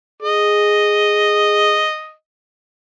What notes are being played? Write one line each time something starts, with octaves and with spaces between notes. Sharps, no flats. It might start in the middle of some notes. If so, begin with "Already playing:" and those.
G#4 D#5